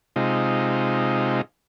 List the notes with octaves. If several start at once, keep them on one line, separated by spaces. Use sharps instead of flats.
C3 G#3 D#4 F4